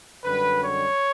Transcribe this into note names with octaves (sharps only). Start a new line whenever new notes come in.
F#2 D3 G3 B4
C#5